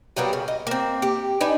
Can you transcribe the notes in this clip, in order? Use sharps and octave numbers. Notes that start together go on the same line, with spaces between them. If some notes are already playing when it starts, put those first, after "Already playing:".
F#3 G3 A#3 B3
C#3
D#5
A#3 C4
G4
D4 D#4 B4 G#5